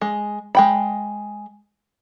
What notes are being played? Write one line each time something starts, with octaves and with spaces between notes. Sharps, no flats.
G#3
G#3 G5 B5